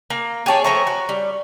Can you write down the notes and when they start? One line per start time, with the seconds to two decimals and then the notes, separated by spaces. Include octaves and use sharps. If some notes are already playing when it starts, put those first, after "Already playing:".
0.10 A#3 A#5
0.46 G4 G#4 C#5 G#5 A5
0.64 F3 A3 C#5 A#5 C#6
0.87 F#4
1.09 G3